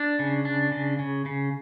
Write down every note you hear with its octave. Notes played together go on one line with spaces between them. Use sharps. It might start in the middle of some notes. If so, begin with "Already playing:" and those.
Already playing: D4
C#3
D4
C#3
C#3
C#3